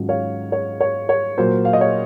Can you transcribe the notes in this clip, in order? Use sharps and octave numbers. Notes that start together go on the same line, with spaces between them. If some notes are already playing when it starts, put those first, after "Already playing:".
Already playing: G#2 D#3 F#3 C#4 F4
C#5 F5
C#5
C#5
C#5
A#2 F#3 A#3 C5
F5
D#5
C#5